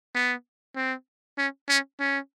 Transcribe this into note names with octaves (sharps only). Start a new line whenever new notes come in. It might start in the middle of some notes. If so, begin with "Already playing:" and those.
B3
C4
C#4
C#4
C#4